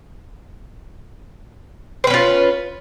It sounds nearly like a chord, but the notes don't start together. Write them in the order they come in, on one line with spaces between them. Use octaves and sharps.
C5 B4 C#4 F4